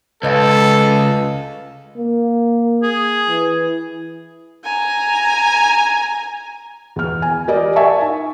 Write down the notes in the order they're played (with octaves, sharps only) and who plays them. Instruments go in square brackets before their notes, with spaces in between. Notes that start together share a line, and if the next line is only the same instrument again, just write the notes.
[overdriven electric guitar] C#2 [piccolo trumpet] A4 [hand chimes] B4 D#5 F5
[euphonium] A#3
[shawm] G#4
[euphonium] E3
[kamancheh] G#5 A#5
[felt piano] E2 F6
G#5
G4 A#4 D5 D#5
E5 G#5 A5 C#6
D#4